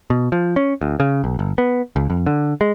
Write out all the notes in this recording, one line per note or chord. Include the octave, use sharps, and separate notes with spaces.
B2
F3
C#4
D2
C#3
B1
G1
B3
C#2
F2
D3
G#3